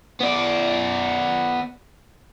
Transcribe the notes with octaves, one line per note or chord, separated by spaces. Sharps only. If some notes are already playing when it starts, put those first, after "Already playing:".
B3 D5